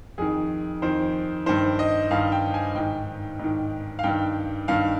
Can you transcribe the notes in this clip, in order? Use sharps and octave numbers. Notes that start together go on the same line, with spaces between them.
F2 D#3 G#4
F2 D#3 C5
G2 D#3 C5
D#5
G2 D#3 F5
G5
G#5
G#2 D#3 G5
G#2 D#3
F5
G2 D#3 G5
G2 D#3 F5